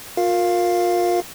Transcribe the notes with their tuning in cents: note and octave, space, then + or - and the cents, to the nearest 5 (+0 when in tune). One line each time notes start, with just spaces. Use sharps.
F4 +35 A#4 +0 F5 +0